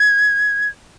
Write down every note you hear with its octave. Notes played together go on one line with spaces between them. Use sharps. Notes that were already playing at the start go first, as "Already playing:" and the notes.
Already playing: G#6